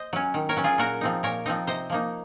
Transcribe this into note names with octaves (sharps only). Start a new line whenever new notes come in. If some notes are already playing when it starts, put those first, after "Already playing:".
Already playing: C5 D#5
F#3 C#4
D#3
A#4 C#5
F#3 C#4
F4 G#4
A#2 F#4 A#4
F3 C4 D#4
A#2 A#4 C#5
F3 C4 D#4
C3 C5 D#5
F3 A#3 D#4